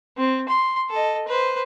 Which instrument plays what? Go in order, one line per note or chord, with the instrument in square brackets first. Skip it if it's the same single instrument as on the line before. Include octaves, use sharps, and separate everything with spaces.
[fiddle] C4
C6
A4 D#5
B4 C5